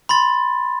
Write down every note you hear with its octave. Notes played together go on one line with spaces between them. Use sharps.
B5 C6 A6